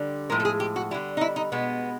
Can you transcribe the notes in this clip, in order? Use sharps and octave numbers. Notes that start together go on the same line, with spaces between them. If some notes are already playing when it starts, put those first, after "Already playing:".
Already playing: D3 G3
A2 F3 G#3 A#4
A4
G#4
G4
F#4
D3 G3 E4
D#4
E4
D#4
B2 G#3 B3